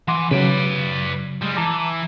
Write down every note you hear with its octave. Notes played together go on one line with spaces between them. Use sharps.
E3 F#5 C6 D6
C#3 F#3 B4 D5
G3 G#3
E3 A5 A#5 D6